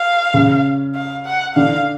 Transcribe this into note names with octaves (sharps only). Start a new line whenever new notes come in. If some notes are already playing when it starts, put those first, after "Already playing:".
Already playing: F5
C#3 C#4
F5
F#5
D3 D4 F5